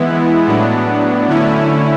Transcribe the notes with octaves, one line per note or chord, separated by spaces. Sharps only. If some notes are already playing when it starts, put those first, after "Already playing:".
Already playing: E3 G#3 B3 E4
A2 F#3 B3 D4
D3 A3 C#4 E4